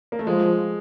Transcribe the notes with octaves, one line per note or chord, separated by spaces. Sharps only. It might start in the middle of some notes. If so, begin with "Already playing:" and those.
A#3
A3
F3 G#3